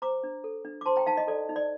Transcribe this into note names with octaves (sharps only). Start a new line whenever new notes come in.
C5 A#5 D6
D4
A4
D4
D6
C5 A5 C6
G5 A#5
D#4 F5 A5
D#5
A4 D5
D#4
D5